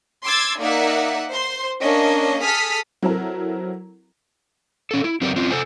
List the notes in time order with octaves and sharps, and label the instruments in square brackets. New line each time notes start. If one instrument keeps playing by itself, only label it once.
[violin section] C6 D6 E6 G#6 A6
A#3 D#4 D5 E5 F#5
C5 C6
A#3 C#4 D4 D#5
G#4 A4 D#6 F6 B6
[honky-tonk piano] F#3 C4 E4 A4 A#4
[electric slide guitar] C#4 A4
E4
F#3 C4 G4 A#4 B4 D5
C4 C#4 F4
A4 C5 G#5